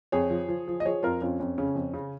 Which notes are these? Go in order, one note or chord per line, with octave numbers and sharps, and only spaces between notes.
F2 G#4 C#5
F3
F3
F3
D#5
F3 G#4 C#5
F2 F4 A#4
F2 C#4 F4
F2 C#4
C#3 C#4
F2
C#3